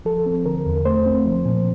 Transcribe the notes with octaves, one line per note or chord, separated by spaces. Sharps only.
F3 A4
C4
D3 A#4
E2
A3 C5
C4
F3
A#2